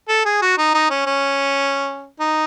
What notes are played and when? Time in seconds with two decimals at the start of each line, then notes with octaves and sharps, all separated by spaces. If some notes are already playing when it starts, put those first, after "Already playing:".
0.08 A4
0.25 G#4
0.42 F#4
0.58 D#4
0.74 D#4
0.90 C#4
1.06 C#4
2.20 D#4